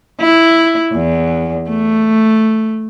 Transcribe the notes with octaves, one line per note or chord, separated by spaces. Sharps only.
E4
E2
A3